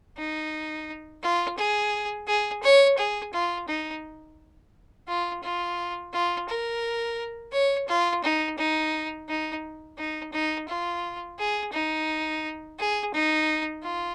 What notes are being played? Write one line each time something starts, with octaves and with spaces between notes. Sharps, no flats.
D#4
F4
G#4
G#4
C#5
G#4
F4
D#4
F4
F4
F4
A#4
C#5
F4
D#4
D#4
D#4
D#4
D#4
F4
G#4
D#4
G#4
D#4
F4